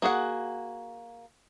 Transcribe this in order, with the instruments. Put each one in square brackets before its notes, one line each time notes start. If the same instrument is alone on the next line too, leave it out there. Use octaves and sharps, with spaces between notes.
[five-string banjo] A#3 F#4 G#4 F#5